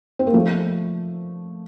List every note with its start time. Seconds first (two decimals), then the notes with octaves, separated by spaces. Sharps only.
0.19 C4
0.27 A#3
0.34 F3 A3